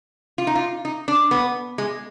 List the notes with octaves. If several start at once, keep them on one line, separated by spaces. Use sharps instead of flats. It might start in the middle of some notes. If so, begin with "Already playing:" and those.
F4
D#4
F4
D#4
D4
B3
G#3